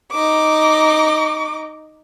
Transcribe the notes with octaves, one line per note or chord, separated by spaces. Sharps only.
D#4 D6